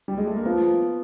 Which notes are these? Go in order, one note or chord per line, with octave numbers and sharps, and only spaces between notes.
G3
G#3
A3
A#3
F3 B3